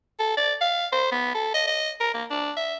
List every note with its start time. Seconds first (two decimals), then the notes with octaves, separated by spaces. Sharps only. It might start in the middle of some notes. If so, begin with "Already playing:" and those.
0.19 A4
0.37 D5
0.61 F5
0.92 C5
1.12 B3
1.34 A4
1.54 D#5
1.67 D#5
2.00 A#4
2.14 A#3
2.30 D4
2.56 E5